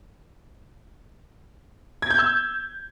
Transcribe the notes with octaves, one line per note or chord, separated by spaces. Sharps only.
G#6
G6
E6